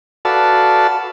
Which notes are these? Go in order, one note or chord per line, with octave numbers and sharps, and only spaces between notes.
F#4 A4 B4 D5 F5 A5